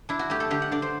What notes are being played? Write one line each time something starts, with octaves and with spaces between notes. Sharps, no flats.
D4 E4
F#4
A3 G4
A4
D3 G4
F#5
D3 D5
C5